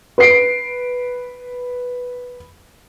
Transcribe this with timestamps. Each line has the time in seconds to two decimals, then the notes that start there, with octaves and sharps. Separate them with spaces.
0.18 B4 C7 D7